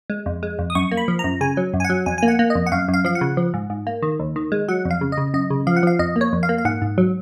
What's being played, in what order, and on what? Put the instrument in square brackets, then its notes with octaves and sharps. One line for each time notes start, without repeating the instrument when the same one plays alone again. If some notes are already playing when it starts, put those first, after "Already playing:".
[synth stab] G#3
F2
G#3
F2
D#6
F#2 C#6
A#3
B5
F3
A#5
F#2
C#3 G#5
F#3
F#2
G#5
F#5
F#3
F2 G#5
A#3 G#5
F#5
A#3
D#5
F2
F#5
F#2 F5
F#2
F5
F3 F5
F#5
C#3
F3
G#2
G#2
A#3
D#3
D#2
D#3
G#3
F#3 F#5
F2
F5
C#3
D#5
C#3
F#2 D#5
C#3
F3 F5
F#5
F3 F5
F2 D#5
A#3
C#5
F2
F5
A#3
F5
G#2 F#5
G#2
F#3